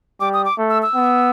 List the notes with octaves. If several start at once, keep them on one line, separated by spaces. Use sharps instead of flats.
G3 D6
D#6
D6
A3
E6
E6
B3